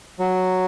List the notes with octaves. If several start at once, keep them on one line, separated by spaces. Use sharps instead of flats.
F#3